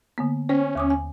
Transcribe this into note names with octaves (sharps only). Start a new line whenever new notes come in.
D3 A#3 B3
C#4 C5 C#5 G5
D#2 D6 D#6
G#5